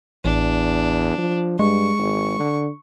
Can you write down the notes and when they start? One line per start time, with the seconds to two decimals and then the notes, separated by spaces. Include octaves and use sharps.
0.25 A1 E2 D4
1.18 F3
1.59 G2 G#3 C#6
1.98 G#1
2.39 D3